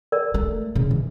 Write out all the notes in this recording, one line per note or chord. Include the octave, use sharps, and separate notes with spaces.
A#4 D5
A3
C#3 C#4
E3